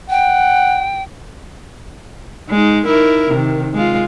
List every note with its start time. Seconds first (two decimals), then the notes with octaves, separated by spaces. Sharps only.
0.10 F#5 G5
2.49 G#3 D#4
2.85 D#4 E4 A#4
3.30 C3 D#3
3.74 G#3 F4